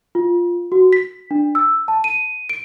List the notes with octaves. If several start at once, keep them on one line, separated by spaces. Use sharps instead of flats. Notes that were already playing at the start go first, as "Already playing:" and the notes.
F4
F#4
B6
D4
E6
A5
D#7
D7